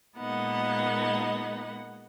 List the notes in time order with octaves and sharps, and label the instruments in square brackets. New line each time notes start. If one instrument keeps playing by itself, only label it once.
[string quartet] A#2 G#3 A#3 B3 D#4 F#5